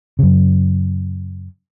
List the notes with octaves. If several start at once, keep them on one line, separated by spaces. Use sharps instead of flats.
F#2 C#3